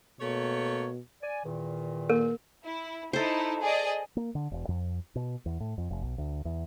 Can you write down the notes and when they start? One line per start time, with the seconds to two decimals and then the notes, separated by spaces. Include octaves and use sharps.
0.21 B2 A3 A#3 C#5
1.22 D5 G#5
1.44 E2 A#2 D#3
2.10 A#3 A#4
2.65 E4
3.13 D#4 E4 A4 C5
3.62 G#4 D5 D#5
4.17 A#3
4.35 D3
4.51 E1
4.68 F2
5.16 B2
5.46 E2
5.60 A2
5.78 F2
5.90 F1
6.03 B1
6.18 D2
6.45 E2